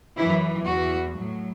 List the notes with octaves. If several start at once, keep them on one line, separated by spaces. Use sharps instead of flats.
F#2 E3 E4
E2 E3 F#4
A2 F#3